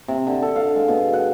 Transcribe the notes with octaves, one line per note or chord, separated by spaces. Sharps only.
C3
D3
A4
F5
G#3
B2
F#5